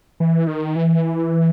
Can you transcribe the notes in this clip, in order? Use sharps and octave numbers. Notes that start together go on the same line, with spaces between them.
E3
D#3
E3